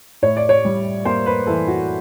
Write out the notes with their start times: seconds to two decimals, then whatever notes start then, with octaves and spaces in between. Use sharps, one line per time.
0.22 A2 C#5
0.37 D5
0.49 C#5
0.65 G3
1.05 A#3 C5
1.26 B4
1.47 E3 A4
1.68 F#4